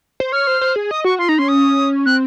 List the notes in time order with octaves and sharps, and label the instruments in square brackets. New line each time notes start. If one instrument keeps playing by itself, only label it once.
[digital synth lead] C5
[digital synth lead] C#5 [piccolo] F6
[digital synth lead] C5
C5
G#4
[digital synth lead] D#5 [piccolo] D#6
[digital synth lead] F#4 [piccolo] C#6
[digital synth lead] F4 [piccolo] C6
[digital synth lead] D#4 [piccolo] A#5
[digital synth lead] C#4 [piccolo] C6
[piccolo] D#6
[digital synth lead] C4 [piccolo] F#6